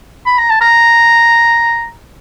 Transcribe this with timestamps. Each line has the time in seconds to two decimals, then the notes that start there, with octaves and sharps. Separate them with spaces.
0.26 B5
0.38 A#5
0.50 A5
0.61 A#5